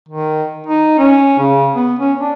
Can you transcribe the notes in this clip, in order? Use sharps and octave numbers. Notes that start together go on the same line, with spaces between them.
D#3
D#4
C#4
C#3
B3
C#4
D4